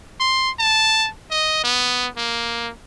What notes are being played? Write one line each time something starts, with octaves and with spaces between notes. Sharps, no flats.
C6
A5
D#5
B3
A#3